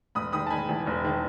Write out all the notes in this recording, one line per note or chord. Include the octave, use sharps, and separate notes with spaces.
E1 B5 D#6
D#3 B5 D#6
A5
D#3 G#5 B5
E2
E1
D#3